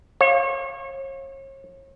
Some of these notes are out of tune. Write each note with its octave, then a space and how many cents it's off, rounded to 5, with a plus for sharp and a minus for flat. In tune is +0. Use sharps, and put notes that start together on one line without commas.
C#5 -40 F5 +0